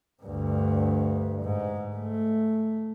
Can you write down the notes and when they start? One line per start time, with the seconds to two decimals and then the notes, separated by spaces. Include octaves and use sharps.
0.22 D2 G2
1.42 G#2
1.96 A3